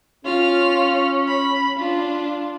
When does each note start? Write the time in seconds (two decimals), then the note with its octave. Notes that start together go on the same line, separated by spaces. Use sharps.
0.25 C#4 F4 F6
1.28 B5
1.78 D4 F4